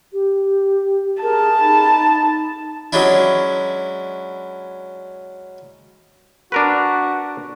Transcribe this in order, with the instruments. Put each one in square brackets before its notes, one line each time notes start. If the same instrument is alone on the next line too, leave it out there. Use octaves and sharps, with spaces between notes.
[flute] G4
[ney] G#4 [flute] A#4 [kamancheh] A5
[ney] D#4 [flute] B5
[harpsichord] F#3 G#3 C#4 D4 E4
[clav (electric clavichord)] D4 A#4 B4 [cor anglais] F#4